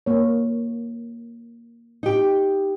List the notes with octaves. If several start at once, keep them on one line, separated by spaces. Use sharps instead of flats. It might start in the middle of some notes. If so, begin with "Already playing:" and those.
A#3 C#5
D#4 G4